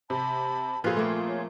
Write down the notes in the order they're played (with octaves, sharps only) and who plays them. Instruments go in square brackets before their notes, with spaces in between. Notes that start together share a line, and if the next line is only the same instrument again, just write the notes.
[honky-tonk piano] C3 [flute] A5 [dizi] B5
[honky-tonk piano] A#2 G#4 [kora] F3 B4 F5 [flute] A4 [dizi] G#5
[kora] A3 A#3 C4 [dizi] F4
[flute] C#5